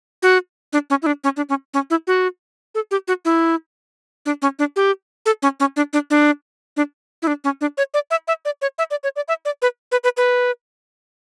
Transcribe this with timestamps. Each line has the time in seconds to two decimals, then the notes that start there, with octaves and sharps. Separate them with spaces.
0.23 F#4
0.73 D4
0.90 C#4
1.02 E4
1.06 D4
1.24 C#4
1.37 D4
1.49 C#4
1.74 C#4
1.90 E4
2.07 F#4
2.75 A4
2.91 G4
3.08 F#4
3.25 E4
4.26 D4
4.42 C#4
4.59 D4
4.76 G4
5.26 A4
5.42 C#4
5.60 C#4
5.76 D4
5.93 D4
6.10 D4
6.77 D4
7.22 E4
7.27 D4
7.44 C#4
7.61 D4
7.77 C#5
7.94 D5
8.11 E5
8.28 E5
8.45 D5
8.62 C#5
8.78 E5
8.91 D5
9.03 C#5
9.16 D5
9.28 E5
9.45 D5
9.62 B4
9.92 B4
10.04 B4
10.17 B4